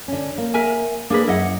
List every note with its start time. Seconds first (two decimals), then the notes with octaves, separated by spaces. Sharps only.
0.08 D3 C#4
0.38 A#3
0.54 A#4 E5 G#5
1.10 A#3 D4 G#4 B4
1.27 F#2 E4 D#5 F#5